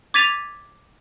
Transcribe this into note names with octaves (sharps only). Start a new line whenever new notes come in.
D6 G#6 A6 B6 D#7 F7